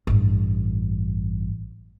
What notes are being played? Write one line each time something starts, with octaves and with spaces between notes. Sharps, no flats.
A1 G2